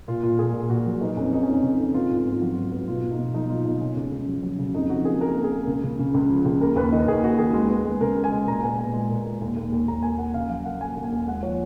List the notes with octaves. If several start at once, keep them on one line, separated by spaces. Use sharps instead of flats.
A#2 F4
A#2 F4
A#2 G#4
A#2
A#2 F#4
F#3
B3 D#4
F2 C#4
B3 D#4
C#4
F2 D#4
C#3
F2
B3 F4
G#2
F4
B3
F#3 F#4
G#2
B3
F#4
B2 F4
B2
D#4
B2
F#3 D#4
B2 F4
B2 D#4
C#3 C#4
C#2
C#2
F#3
F#3
C#3
F2 D#4
F3 F#4
A#3 G#4
A#3 A#4
A#3
G#4
A#3
C#2
C#3
C#3
C#2
F3
C#2
D#2 A#4
D#2 B4
D#3 D#5
D#2 G#4
D#2 F#4
D#3 G#4
G#3
B3
G#3
C#3 A#4
G#3
G#5
G#3
A#2 A#5
B3 G#5
A#2 G#5
G#3
A#2
G#3
D#2
D#2
D#2
D#2 A#5
A#3 G#5
A#3 F#5
C#3 F5
F#3 F5
A#3 F#5
A#3 G#5
D#2
G#5
D#2
G#3 F#5
F3 C#5